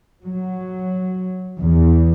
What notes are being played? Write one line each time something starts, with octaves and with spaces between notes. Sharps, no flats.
F#3
E2